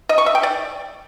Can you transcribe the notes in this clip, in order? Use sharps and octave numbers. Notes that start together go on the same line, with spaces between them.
D#5
C#6
E5
G5
D5